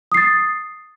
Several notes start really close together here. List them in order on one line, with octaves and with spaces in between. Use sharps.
D#6 C7 A6